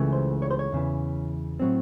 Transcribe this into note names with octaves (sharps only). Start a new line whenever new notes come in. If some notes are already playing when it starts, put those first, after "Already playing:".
Already playing: C#2 C#3 E3 A3
C5
C#5
C5
C#5
E2 C#3 E3
A2 F#3 C4